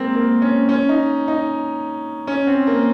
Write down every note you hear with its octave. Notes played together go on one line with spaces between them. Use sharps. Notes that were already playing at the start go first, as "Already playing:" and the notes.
Already playing: G#3 A#3 C4
A#3
C#4
C#4
D#4
D#4
C#4
C4
A#3